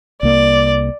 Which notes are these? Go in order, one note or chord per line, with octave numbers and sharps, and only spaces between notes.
C2 A#3 D5